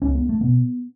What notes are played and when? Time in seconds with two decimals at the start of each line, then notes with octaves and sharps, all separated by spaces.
0.02 C#2 C#4
0.15 B3
0.29 A3
0.41 B2 B3